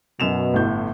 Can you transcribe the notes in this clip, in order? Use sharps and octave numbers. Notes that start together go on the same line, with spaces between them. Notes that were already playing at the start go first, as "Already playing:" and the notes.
F#2 B2 E7 F7
G1 A2 G6